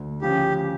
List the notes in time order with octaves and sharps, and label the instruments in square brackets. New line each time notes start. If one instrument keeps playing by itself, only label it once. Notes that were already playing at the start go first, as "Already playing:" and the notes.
Already playing: [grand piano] D2
[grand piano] C#3 F3 C#4 [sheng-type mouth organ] G4